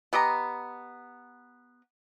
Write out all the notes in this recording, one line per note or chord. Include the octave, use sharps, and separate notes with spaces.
B3 G4 D#5 A#5